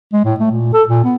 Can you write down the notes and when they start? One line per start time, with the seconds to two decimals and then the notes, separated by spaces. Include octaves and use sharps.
0.13 G#3
0.25 A2
0.40 A3
0.52 A#2
0.73 A4
0.89 A#2
1.05 B3